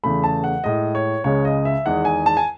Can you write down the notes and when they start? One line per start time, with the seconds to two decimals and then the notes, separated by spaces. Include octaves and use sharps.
0.04 E2 C#3 E3 A3 B5
0.24 A5
0.44 F#5
0.64 A2 G#3 D#5
0.95 C#5
1.24 C#2 C#3 G#3 C#5
1.45 D#5
1.65 E5
1.85 E2 D#3 G#3 F#5
2.05 G#5
2.26 A5
2.37 G#5